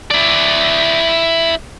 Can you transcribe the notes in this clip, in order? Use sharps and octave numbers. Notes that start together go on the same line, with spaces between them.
E4 D5